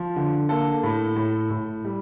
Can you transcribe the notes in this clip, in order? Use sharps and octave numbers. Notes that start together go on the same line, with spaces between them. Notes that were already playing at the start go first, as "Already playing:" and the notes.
Already playing: F3
D3
A#3 A4
A2
A2
A2
G3